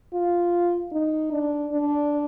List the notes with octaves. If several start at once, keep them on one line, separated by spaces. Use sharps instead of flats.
F4
D#4
D4
D4